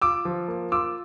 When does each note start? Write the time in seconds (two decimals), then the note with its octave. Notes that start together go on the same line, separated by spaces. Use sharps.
0.02 F4 D6 E6
0.25 F3
0.48 A#3
0.72 F4 D6 E6